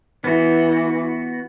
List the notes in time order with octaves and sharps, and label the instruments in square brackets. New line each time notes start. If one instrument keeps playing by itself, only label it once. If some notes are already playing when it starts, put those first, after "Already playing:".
[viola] E3 [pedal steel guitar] B3 F#4